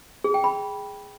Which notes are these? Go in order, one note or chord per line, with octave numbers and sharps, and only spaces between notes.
G#4
G5
B5